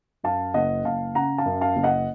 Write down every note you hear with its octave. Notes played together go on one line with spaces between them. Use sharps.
F#2 F5 A5
F#1 D#5 F#5
F#1 F5 A5
C#3 F#5 A#5
F5 A5
F#2
F5 A5
F#1
D#5 F#5